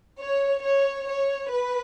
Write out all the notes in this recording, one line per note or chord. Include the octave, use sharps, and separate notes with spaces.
C#5
C#5
C#5
B4